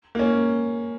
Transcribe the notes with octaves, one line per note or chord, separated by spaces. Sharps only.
A#3 C#4